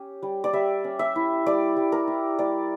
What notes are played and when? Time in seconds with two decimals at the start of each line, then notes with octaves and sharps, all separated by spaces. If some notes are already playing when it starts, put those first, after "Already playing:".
Already playing: C#4 G4
0.22 G3
0.44 D5
0.53 G3 E5
0.84 C#4
0.99 E5
1.16 E4
1.46 G3 D5
1.77 G3
1.92 A#4
2.07 E4
2.39 G3 D5